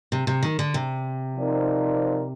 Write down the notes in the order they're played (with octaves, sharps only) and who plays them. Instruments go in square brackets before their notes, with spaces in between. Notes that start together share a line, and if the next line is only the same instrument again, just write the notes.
[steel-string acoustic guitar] C3
C3
D#3
D3
C3
[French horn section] F3 C4 D#4 A#4 D5